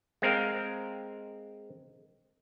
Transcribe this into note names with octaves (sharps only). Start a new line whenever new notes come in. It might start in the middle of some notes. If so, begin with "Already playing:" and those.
G#3 C4 A#4 F5